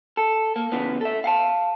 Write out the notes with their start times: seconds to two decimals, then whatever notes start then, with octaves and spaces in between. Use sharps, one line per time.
0.17 A4
0.56 A#3
0.72 C#3 E3 B3
1.01 A4 E5
1.24 F5 F#5 A5